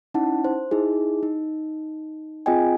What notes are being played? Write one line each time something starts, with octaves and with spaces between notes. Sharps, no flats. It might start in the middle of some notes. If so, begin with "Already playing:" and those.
C#4 D#4 E4 F#5 A5
C5
D#4 E4 G#4
D#4
C4 F4 G#4 D#5 G5 G#5